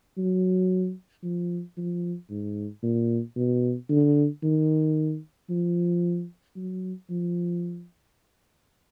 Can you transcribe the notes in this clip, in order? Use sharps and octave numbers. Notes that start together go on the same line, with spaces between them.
F#3
F3
F3
G#2
A#2
B2
D3
D#3
F3
F#3
F3